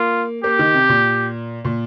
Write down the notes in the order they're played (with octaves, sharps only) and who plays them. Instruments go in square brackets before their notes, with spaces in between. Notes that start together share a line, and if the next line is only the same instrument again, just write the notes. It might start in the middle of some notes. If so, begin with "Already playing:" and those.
Already playing: [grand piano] A#3 [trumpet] F4
[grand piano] A#3 [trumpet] G4
[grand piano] D#3
C3
A#2
A#2